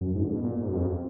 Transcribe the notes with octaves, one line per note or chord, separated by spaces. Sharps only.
F#2
G#2
D3
B2
A#2
G#2
F#2
F2